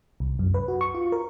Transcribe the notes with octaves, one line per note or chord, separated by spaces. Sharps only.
C2
F#2
B4
F#4
C#6
F4
A#4